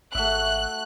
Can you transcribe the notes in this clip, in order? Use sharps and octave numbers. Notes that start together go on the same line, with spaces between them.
G#1 A3 F#4 E5 F#6